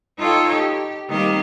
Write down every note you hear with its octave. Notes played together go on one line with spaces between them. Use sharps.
D#4 F4 A4 C#5 D#5 G5
G4
D#3 G3 A#3 C4 G4 A#4